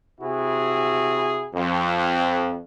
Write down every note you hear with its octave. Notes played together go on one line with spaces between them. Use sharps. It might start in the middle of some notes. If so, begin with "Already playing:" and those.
C3 E4 F#4 G#4
F2